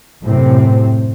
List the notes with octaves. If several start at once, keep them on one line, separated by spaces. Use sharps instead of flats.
F#2 A2 C3 C4